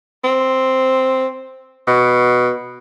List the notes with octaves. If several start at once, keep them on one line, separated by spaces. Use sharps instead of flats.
C4
B2